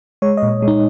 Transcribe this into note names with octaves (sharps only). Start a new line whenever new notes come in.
G#3 C#5
D#5
A#2
G#3
D#4